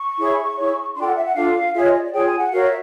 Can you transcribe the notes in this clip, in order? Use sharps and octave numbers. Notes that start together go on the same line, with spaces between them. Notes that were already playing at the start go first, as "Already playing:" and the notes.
Already playing: C#6
E4 G#4 C#5
E4 G#4 C#5
D4 F4 A4 G5 C6
F#5
E5
F#5
D4 F4 A4 F5
F4 G#4 C#5 E5
D#5
D5
D5
F4 G#4 C#5 G5
G#5
F#5
F#4 A#4 C#5 F5
E5